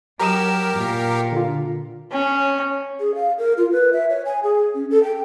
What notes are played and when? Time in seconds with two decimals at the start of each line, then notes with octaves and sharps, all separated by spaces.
0.20 F#3 G4 A#4 A#5 E6
0.77 A#2
1.32 D3 F4
2.12 C#4
3.00 G#4
3.15 F5
3.39 A#4
3.57 F4
3.72 B4
3.93 E5
4.10 C#5
4.25 G#5
4.43 G#4
4.75 C#4
4.90 A4
5.04 G5